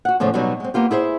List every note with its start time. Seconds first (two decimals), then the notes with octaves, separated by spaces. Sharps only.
0.05 F#4 F#5
0.20 E2 A2 C#3 F3
0.34 B2 F#3 G3 B3 D#4 F#4
0.60 G#3 C4
0.74 A#3 B3 F4 G4
0.91 E4 G#4 C5 E5